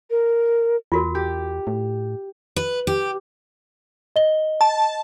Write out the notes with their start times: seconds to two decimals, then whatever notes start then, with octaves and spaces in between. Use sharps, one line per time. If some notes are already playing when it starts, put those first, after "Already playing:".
0.10 A#4
0.92 E2 F4 F#4 A#4
1.15 G4
1.67 A2
2.56 B4
2.87 G4
4.16 D#5 G7
4.61 A5